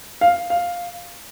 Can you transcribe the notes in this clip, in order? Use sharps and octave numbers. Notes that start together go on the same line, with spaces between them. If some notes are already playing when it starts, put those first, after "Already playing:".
F5
F5